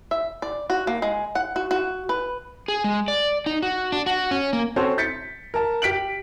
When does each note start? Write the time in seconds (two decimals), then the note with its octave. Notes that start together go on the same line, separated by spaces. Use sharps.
0.11 E5
0.42 D5
0.70 F#4
0.87 A#3
1.02 G#3
1.35 F#5
1.56 F#4
1.71 F#4
2.09 B4
2.68 G#4
2.84 G#3
3.08 D5
3.46 D#4
3.62 F#4
3.92 D4
4.06 F#4
4.31 C#4
4.53 A#3
4.76 C4 C#4 F#4 A4 C5
4.98 G6 A6 B6 C#7
5.54 A#4 A5
5.82 G4 B6 D7 F#7